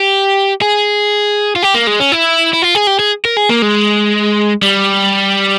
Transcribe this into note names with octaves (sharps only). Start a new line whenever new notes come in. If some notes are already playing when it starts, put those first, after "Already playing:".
Already playing: G4
G#4
F4
G4
A#3
G#3
C#4
E4
E4
F4
G#4
G4
G#4
A#4
G#4
A#3
G#3
G3